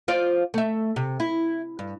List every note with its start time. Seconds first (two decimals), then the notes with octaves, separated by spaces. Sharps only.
0.08 F4 C5 D5
0.54 A3 E5
0.96 C3
1.20 E4
1.79 G2